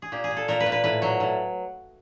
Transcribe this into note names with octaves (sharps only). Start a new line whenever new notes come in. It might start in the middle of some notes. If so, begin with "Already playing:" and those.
G#4
A#2 G4
G#4
A#2
A4
A#2 A#4
B4
A#2
B4
A2 B4
F#3
A2